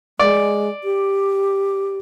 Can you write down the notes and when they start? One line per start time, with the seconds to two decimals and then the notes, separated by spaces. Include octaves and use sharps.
0.20 G#3 D5
0.84 G4